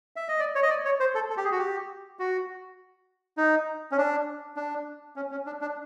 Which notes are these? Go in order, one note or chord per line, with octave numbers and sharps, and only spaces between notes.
E5
D#5
D5
C#5
D#5
D5
C#5
C5
A4
A4
G4
G#4
F#4
G4
F#4
D#4
C#4
D4
D4
C#4
C#4
D4
D4